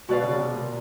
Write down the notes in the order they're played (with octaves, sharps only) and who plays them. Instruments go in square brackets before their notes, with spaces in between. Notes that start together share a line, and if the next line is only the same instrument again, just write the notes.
[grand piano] B2 [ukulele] F#4 B4 D5 F5
[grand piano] C#3
C3
B2
A#2